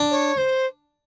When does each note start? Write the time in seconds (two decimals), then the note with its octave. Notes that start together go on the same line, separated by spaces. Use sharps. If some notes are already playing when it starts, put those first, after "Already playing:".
Already playing: D4
0.11 C#5
0.37 C5